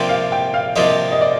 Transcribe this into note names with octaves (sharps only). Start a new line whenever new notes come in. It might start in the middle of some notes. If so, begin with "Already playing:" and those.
Already playing: C3 F3 A#3 D4 G4 G5
F5
G5
F5
C3 F3 A#3 D4 G4 D#5
D#5
D5